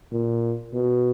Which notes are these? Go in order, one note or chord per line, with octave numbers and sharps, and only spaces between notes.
A#2
B2